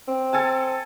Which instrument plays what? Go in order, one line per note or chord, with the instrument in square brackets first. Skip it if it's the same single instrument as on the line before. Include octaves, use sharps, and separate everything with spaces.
[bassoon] C4
[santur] A4 G#5 A5